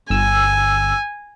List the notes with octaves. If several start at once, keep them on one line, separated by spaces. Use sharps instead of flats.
G1 G#5 E6